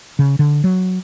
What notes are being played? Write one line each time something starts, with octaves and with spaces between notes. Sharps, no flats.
C#3
D3
F#3